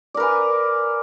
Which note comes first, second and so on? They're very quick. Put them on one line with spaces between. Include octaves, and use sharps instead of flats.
D5 A#4 B4 G#5